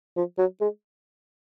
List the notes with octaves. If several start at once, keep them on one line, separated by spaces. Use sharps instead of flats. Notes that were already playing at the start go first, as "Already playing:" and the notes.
F3
F#3
G#3